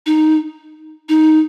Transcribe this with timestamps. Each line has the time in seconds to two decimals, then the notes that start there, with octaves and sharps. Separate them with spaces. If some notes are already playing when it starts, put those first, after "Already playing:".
0.06 D#4
1.09 D#4